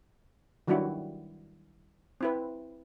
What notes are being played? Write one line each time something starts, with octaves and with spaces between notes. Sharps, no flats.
D#3 F#3 G3 D4 E4 F#4
C4 E4 B4